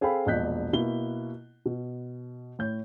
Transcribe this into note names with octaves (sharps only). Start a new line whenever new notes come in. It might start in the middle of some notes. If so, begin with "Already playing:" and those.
C4 G#4 A4 F5 G5 B5
E1 A#1 D#5 F#6 G6 B6
B2 A#3 E4 G7
B2
A2 C#5 G6